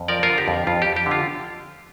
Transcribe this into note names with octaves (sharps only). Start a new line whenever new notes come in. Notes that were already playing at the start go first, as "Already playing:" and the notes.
Already playing: F2
F3 A#4 D5
F4 A#4
D3
G4
F2
F2 F4
F2 G4
G4
D3
F4